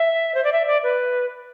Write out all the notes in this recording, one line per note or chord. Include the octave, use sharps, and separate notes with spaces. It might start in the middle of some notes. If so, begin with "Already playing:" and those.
Already playing: E5
C5
D5
E5
D5
B4